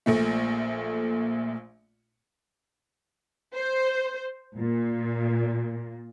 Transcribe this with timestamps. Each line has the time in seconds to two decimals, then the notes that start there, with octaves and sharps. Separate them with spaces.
0.06 A#1 A#2 A3
3.56 C5
4.58 A#2